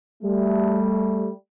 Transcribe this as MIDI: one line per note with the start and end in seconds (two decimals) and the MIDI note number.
0.23 1.31 55
0.23 1.31 57